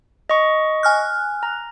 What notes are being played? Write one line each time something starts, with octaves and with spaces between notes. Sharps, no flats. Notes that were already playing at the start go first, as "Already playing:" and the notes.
D#5 C#6
G#5 F6 F#6
A#5